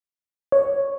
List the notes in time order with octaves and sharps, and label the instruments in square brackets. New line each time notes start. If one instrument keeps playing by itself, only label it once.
[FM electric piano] C#5